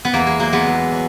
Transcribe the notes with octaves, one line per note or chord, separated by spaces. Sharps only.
B3
E2 A#3
G#3
F#3 A#3
G#3 B3
E2
F#3